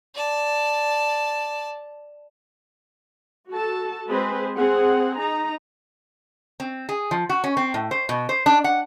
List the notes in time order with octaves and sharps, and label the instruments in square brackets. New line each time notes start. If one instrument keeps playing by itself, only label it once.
[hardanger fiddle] D5 A5
[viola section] F#4 A4 A5
G#3 C4 G#4 B4 C5
C4 G#4 F#5
D#4 A#5
[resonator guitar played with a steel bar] C4
G#4
F3
F#4
C#4
C4
A2
C5
B2
C5
D4
F#5